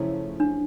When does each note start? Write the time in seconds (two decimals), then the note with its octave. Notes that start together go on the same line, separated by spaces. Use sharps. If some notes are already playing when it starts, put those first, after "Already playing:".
Already playing: F#2 C#3 F3 A3 C#4 E4
0.40 D4